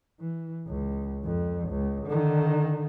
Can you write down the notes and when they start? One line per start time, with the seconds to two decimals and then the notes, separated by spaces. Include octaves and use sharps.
0.20 E3
0.67 C#2
1.24 F2
1.69 C#2
2.06 D3 D#3